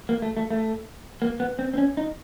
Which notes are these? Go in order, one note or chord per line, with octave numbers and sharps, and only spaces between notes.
A#3
A3
A3
A3
A#3
B3
C4
C4
C#4
D#4